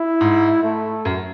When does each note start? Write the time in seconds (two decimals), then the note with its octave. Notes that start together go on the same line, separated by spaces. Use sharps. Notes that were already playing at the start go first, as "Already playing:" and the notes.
Already playing: E4
0.21 G#2
0.64 A3
1.05 F#2